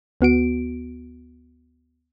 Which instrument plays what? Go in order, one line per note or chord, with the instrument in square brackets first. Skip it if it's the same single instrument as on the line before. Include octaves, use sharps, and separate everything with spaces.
[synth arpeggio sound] D2 B3 F#4 D7